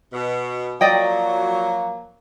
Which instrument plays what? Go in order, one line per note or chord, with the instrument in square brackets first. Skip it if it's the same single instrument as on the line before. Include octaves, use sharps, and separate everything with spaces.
[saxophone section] B2
[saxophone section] F3 F#3 [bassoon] A#3 [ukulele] D5 D#5 G5